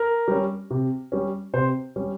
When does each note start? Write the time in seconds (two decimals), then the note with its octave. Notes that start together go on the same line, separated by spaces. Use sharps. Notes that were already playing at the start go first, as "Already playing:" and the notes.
Already playing: A#4
0.28 G3 C#4
0.70 C3
1.12 G3 C#4
1.53 C3 C5
1.96 G3 C#4